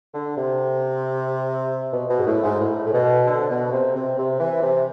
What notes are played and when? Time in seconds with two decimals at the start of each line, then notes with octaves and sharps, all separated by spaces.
0.13 D3
0.36 C3
1.92 B2
2.10 B2
2.18 G#2
2.27 A2
2.43 G#2
2.59 A2
2.86 A2
2.93 B2
3.27 D3
3.39 C3
3.50 B2
3.72 C3
3.95 C3
4.17 C3
4.40 E3
4.61 C3